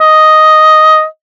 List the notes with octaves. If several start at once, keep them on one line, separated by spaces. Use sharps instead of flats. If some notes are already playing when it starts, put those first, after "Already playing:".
D#5